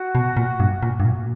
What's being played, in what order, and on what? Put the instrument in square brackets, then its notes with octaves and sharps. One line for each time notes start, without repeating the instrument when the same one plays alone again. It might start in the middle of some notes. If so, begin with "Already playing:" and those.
Already playing: [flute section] F#4
[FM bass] B2
A#2
G2
A#2
G2
A#2